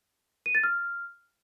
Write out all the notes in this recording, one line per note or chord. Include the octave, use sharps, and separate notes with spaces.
D#7
A6
F6